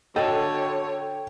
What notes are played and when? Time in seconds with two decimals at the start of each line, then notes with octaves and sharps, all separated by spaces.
0.16 D3 F#4 A4 C#5 D#5 G5